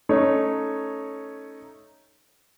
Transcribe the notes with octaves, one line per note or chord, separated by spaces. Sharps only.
A3 C#4 D#4 C#5